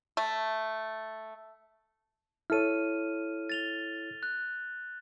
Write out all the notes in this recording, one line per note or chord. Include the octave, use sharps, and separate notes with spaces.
A3
E4 A4 C#5 F6 D#7
A6 F7 G7
F#6